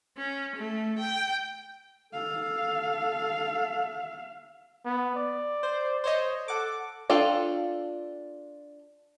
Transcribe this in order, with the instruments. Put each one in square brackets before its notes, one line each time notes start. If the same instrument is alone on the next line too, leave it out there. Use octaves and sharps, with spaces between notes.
[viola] C#4
A3
G5
[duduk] A4 [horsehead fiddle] F5
[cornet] B3
D5
[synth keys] C5
C5 C#5 D#5
[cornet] A4 [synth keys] F#5 D6
[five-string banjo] D4 F4 A4 F5 G5